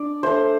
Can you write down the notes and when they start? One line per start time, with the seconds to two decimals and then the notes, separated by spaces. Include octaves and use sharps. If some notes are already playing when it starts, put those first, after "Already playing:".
Already playing: D4 D5
0.23 A3 D4 C5